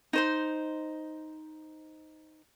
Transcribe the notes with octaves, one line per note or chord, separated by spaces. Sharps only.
D#4 C5 C6